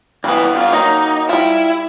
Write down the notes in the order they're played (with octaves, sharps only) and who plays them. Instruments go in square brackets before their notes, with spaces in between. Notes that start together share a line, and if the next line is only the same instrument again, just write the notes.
[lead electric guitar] B1 E3 [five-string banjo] G3 B3
[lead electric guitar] G2 F4
[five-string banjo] D#3 F#3 A#3 [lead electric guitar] D#4
[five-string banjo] G3 F4 [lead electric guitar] E4